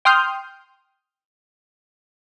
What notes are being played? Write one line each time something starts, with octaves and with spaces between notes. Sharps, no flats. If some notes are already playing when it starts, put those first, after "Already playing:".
G5 C6 D#6 F6 G6